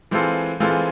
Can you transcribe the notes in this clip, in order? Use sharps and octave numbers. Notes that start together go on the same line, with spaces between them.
E3 G#3 C4 F4 A4
E3 G#3 C4 F4 A4